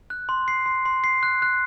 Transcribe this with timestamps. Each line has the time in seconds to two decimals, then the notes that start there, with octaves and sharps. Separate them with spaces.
0.10 F#6
0.29 C6
0.48 C7
0.66 C6
0.85 C6
1.04 C7
1.23 F#6
1.42 F#6